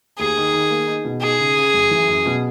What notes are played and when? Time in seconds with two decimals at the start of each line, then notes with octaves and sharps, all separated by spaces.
0.19 D#2 G#4
0.37 D#3
0.53 D#3
0.70 A#3
0.87 D#4
1.05 B2
1.22 D#4 G#4
1.39 C#3
1.57 C#3
1.74 F#2
1.91 E3
2.08 F#2
2.26 B2